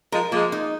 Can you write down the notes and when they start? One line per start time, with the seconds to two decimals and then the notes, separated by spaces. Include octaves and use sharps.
0.12 F3 G#3 A#4
0.32 F3 G#3 A#3
0.52 D#4